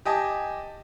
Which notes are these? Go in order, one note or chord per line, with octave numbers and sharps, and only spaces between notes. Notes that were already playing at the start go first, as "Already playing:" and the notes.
G4 D#5 G#5 A5